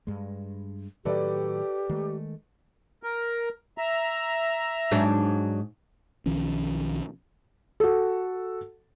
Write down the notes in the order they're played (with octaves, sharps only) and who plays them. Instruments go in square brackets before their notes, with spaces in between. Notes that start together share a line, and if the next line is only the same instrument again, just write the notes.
[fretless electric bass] G2 G#3
[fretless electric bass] A2 D#3 F#3 [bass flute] G4 [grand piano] A4 B4 D5
[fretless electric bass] D#3 G#3 A3
[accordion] A#4
E5 A#5
[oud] G#2 F#3 D4
[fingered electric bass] B1 D#3 F3 C#4
[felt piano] F#4 A4